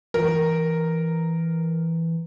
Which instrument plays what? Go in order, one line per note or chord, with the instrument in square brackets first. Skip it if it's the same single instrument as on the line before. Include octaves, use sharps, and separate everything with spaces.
[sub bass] E3 [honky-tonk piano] A#4